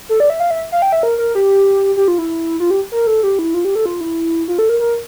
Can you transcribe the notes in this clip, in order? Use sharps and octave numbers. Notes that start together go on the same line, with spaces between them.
A4
D5
E5
F5
E5
F5
G5
E5
A#4
A#4
G4
G4
F4
E4
F4
G4
A#4
A4
G4
E4
F4
G4
A4
F4
E4
F4
A4
A#4
A#4